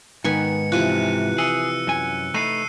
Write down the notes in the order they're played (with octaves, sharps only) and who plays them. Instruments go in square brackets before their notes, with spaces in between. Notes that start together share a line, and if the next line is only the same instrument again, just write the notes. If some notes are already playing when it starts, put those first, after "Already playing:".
[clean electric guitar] G#2 B3 [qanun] D#3 B4 G#5 [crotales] C#7
[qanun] C3 E3 F3 [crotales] F#6 D#7
[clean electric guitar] G#4 [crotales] E6 C#7
[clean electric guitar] F#2 G#5
[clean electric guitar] A3 D#4 B4 [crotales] C7 D#7